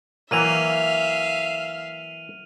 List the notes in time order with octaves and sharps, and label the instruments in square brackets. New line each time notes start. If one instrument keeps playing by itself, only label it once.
[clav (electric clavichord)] E3 F#3 A#3 [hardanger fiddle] E5 F5 [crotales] F6 D#7 F7